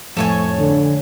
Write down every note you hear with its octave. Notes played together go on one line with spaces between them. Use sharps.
F2 A2 A4 C#5 G#5
D3